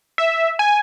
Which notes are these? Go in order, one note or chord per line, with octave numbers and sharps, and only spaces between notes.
E5
G#5